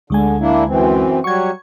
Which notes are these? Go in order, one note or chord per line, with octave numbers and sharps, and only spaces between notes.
D2 D3 G#3 G#5
A#3 D4 E4
F#2 E3 C4
F#3 G3 F#4 C#6 G#6